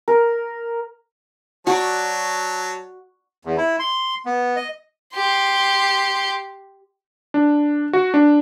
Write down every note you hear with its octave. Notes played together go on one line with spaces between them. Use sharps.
A#4
F#3 F#4 D5 A5
E2
E4
C6
B3
D#5
G4 C6
D4
F#4
D4